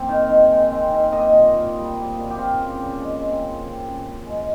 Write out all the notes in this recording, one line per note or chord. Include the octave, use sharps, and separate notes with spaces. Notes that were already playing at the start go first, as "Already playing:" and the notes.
Already playing: A#3 C4
D#3
D#3
G#3
C4
D#3
A#3 D#5
A#2
A#2
G3
A#3
A#2
G4
C4 F4
C#3
C#3
G#3
C4
C#3
C4
C#3
C#3
G#3